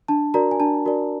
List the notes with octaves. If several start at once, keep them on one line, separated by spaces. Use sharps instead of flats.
D4 A5
F#4 A#4 D5 A#5
G#5
D4 A5
F#4 A#4 D5